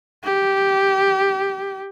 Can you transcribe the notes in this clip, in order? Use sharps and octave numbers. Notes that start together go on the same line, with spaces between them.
G4